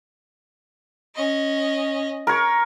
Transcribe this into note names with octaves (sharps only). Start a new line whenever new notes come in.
C#4 D#5
A#4 C#5